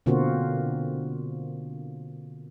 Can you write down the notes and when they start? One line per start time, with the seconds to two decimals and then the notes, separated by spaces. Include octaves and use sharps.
0.06 B2 D3 A#3 C4 F4 F#4